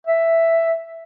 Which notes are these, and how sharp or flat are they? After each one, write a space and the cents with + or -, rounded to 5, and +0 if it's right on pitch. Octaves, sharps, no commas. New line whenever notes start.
E5 +5